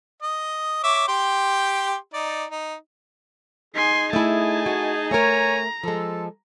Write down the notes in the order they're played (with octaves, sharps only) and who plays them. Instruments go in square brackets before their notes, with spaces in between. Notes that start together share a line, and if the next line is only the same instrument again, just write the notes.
[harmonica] D#5
C#5 E5 D6
G4 G5 C6
D#4 D5
D#4
[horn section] D#4 G#4 [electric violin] G#5 C6
[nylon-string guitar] A3 E4 [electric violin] G#5 A5
[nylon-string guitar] F#4
[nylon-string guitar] A3 A#4 [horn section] C#5 G#5 [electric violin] A#5
[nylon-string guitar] F3 G#3 [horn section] A4